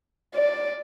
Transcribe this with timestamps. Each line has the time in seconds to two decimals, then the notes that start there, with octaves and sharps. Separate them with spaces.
0.35 D5